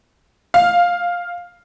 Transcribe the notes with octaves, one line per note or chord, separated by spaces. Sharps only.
F5